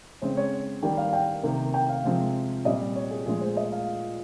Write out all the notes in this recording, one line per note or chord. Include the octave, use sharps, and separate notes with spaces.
C#3 G#3 C4 C5
C#5
D#3 G3 A#3 G5
F5
G5
C3 D#3 A#3
G5
F5
C3 F3 G#3 C4
A#2 G3 C4 D#5
C#5
G#4
A#2 F3 G#3 G#4
C5
D#5
F5